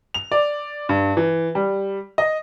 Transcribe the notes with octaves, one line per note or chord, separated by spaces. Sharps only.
F7
D5
G2
E3
G3
D#5